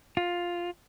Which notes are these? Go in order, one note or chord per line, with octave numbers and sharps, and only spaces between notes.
F4